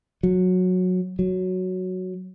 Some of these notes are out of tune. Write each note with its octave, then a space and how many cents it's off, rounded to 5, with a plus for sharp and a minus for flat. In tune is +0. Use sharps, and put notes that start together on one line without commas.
F#3 -15
F#3 +0